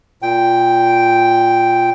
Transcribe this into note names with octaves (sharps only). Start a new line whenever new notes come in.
A#2 G5